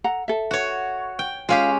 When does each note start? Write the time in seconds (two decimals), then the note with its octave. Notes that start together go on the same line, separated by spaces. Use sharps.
0.04 A4 F#5 A#5
0.28 A4 E5
0.51 F#4 C#5
1.19 G5
1.49 G#3 C#4 F4 G4 F5